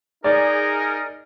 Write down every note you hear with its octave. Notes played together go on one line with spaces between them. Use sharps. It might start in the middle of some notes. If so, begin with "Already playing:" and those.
D#4 G#4 A#4 D5